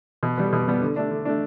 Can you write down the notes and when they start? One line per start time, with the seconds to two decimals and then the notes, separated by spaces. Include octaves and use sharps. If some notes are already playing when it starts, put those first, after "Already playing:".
0.23 B2
0.37 G3 B3
0.52 B2
0.68 G3 B3
0.82 D3
0.96 A3 D4
1.11 D3
1.25 A3 D4